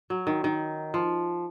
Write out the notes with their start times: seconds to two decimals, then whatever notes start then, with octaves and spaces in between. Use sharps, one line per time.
0.10 F#3
0.27 D#3
0.44 D#3
0.94 F3